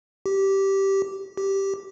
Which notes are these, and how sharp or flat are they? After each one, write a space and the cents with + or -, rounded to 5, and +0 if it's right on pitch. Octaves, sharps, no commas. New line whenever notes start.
G4 -10
G4 -5